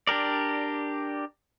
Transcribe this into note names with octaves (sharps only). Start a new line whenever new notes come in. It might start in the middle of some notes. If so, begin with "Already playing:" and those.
D4 G4 A#4 D5